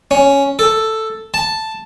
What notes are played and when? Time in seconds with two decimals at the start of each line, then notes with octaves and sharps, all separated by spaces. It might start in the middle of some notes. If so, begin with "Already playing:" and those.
0.11 C#4
0.59 A4
1.34 A5